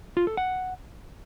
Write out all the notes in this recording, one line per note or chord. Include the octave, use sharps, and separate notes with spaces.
F4
A4
F#5